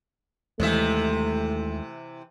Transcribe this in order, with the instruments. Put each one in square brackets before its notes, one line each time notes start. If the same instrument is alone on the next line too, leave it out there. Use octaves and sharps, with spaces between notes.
[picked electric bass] D#2 G#3 [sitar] C3 E3 E5 [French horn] A3